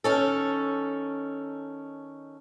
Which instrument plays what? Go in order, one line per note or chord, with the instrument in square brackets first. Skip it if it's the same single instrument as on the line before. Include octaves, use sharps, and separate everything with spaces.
[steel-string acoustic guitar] D#3 C#4 A4